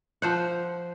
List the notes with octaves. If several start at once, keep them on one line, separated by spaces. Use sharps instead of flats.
F3 C5 F#5